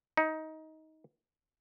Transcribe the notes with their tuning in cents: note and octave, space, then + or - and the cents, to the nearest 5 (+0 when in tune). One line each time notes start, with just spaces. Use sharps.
D#4 +20